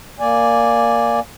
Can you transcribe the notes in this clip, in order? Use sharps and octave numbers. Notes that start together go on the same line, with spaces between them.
A#3 D5 G#5